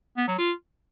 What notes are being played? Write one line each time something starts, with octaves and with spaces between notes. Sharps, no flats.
B3
F#3
F4